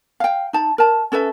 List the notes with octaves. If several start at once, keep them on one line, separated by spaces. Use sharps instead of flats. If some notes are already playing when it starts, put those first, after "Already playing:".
F5 G5
D#4 A5
A#4 A5
C#4 A4 B4 E5